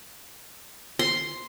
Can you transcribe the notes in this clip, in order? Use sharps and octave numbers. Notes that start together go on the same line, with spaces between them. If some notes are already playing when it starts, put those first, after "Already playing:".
C6